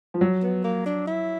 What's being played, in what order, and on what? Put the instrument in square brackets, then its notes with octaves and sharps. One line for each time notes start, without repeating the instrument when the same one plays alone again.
[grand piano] F3
F#3
[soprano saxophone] B3
A#3
D4
E4